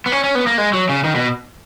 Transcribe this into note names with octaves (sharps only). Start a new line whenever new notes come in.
B3
C#4
C#4
B3
A#3
G#3
F#3
C#3
D#3
B2